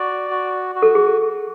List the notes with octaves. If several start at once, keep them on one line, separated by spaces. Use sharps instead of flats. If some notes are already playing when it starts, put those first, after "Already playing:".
Already playing: F#4 D5
F#4
F#4
A4
G#4